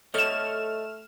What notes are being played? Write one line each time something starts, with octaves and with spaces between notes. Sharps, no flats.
A3 A4 C#5 D#5 F6 E7